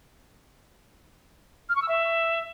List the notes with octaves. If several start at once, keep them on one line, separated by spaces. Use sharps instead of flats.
F6
C#6
E6
E5